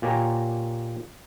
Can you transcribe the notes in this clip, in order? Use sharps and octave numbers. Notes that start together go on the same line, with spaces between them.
A#2 A#3 G4 C#5 G#5 A#5